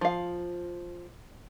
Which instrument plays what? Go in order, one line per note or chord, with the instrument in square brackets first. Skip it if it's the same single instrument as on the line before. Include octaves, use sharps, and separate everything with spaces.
[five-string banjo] F3 F5